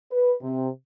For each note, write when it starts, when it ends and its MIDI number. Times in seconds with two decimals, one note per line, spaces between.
0.12 0.33 71
0.42 0.68 48